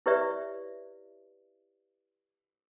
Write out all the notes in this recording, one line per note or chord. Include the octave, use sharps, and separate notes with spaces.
E4 G4 B4 C#5 D5 E5